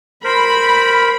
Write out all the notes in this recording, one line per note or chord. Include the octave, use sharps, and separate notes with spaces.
A#4 C5 B5